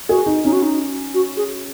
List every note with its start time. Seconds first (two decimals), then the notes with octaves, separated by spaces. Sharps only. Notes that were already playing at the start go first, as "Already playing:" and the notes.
0.09 F#4 G#4
0.26 D#4
0.44 C#4 D#4
0.53 F#4
0.63 D#4
1.14 F#4
1.37 G#4